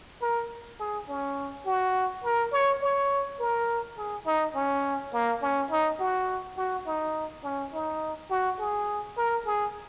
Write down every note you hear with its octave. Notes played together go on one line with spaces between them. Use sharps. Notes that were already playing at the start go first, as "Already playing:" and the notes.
A#4
G#4
C#4
F#4
A#4
C#5
C#5
A#4
G#4
D#4
C#4
A#3
C#4
D#4
F#4
F#4
D#4
C#4
D#4
F#4
G#4
A#4
G#4